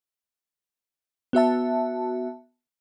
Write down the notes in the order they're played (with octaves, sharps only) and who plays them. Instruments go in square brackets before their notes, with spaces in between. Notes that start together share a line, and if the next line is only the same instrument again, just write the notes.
[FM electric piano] B3 F#4 E5 A5